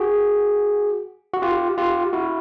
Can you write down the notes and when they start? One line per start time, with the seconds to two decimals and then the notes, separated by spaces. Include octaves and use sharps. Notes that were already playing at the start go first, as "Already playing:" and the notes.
Already playing: F#4 G#4
1.34 F#4
1.42 F4 G4
1.78 F4 G4
2.13 E4 F#4